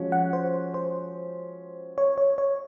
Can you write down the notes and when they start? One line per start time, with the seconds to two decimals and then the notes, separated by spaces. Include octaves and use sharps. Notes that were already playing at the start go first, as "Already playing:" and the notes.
Already playing: F3 G#3 C#4 F#4
0.12 F#5
0.33 C5
0.74 C5
1.98 C#5
2.18 C#5
2.38 C#5